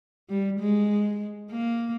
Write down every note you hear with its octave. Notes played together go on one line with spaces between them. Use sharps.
G3
G#3
A#3